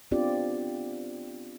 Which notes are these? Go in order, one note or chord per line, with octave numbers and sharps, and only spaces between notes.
B3 C4 D4 F4 G4 D5